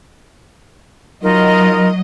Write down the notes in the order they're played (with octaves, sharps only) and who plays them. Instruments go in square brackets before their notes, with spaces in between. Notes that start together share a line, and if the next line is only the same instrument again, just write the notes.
[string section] F#3 D#5 [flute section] D#4 F4 A#4